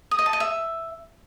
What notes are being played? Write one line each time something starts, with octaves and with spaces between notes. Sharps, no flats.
D#6
D#5
A5
D#5
E5